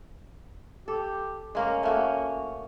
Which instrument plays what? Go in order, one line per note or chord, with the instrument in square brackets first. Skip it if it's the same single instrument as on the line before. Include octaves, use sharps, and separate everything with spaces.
[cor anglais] G4 [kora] A4
[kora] G#3 A#3 A#4 [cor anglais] C#4
[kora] A3 A#3 F#4